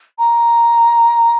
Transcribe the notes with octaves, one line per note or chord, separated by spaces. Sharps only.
A#5